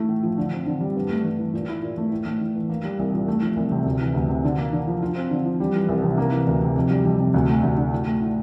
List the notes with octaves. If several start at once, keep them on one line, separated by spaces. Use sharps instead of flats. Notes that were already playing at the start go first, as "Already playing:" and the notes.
Already playing: A3 E4
A2
F3
D3
C4
D3
G3
G2
A3
G2
E3
A#2
E4
A#2
A3
A2
A3
A2
E3
A#3
G3
C2
A#2
A3
F3
C2
C3
D2
E3
D2
C3
D3
A#3
D3
F3
F4
C4
D3
F3
G3
E3
C2
C3
A#3
E3
D2
C3
F2
G3
F2
C3
D2
A3
D2
D3
A2
A3
A2